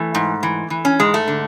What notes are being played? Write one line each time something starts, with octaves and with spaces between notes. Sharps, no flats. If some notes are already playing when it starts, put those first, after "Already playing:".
Already playing: E3 A3
G#2
E3
E3
C#4
G#2 G#3
A3
D3